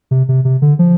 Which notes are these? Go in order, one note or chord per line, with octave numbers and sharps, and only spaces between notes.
C3
C3
C3
D3
F3